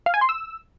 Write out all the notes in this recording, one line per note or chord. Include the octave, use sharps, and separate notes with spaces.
F5
G#5
C6
E6